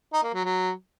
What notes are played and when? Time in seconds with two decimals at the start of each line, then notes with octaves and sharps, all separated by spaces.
0.13 D#4
0.23 A#3
0.34 F#3
0.44 F#3